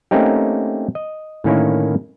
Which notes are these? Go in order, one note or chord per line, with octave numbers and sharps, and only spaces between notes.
A3 A#3 C4 C#4 D#4 G4
D#5
A2 D3 D#3 A#3 C#4 E4